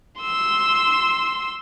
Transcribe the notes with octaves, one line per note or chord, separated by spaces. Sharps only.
C6 E6